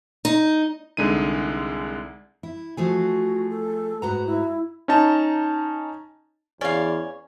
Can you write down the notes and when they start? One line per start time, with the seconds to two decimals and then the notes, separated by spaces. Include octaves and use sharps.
0.25 D#4
0.97 C2 D3 G#3 D#4 D#7
2.43 E4
2.77 F3 A3 F#4 G#4
3.50 A4
4.02 G#2 F#4 B4 A#5
4.27 E4
4.88 C#4 D#4 A5 A#5
6.61 E2 C#4 D5 F5